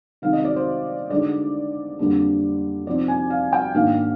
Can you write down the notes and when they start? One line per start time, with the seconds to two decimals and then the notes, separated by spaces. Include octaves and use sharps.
0.22 C3 D#3 G#3 D#4 F5
0.33 D#5
0.45 D5
0.56 C5
1.10 D3 G#3 D#4 D5
1.99 F2 D3 G3 A#3 D4
2.86 C3 F3 C4 D#4 D5
3.08 G#5
3.30 F5
3.53 G5
3.74 G#2 D#3 A#3 D4 F5